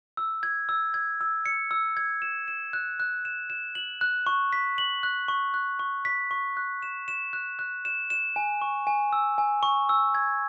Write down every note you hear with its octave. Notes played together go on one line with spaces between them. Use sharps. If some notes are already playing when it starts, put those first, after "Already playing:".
E6
G#6
E6
G#6
E6
C#7
E6
G#6
E7
E7
F#6
F#6
E7
E7
F#7
F#6
C#6
B6
F#7
F#6
C#6
F#6
C#6
B6
C#6
F#6
E7
E7
F#6
F#6
E7
E7
G#5
C#6
G#5
E6
G#5
C#6
E6
G#6